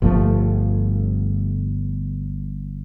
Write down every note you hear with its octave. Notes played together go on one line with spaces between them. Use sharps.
G1 G2 F3 A3